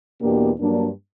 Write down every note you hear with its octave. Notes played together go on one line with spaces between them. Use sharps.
E2 B2 A#3 D4 G4
G2 F#3 A#3 D4